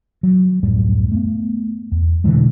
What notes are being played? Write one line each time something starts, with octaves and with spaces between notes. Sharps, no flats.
F#3
D1 F#2 A2 G3
A3 B3
E2
B2 D3 E3 G#3